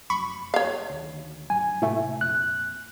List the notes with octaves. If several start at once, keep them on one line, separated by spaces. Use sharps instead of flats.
F1 F#2 B5 C#6
C#5 F5
D2 D#3
D1 G2 F#3 G#5
A2 C3 A3
F2 A#2 F#6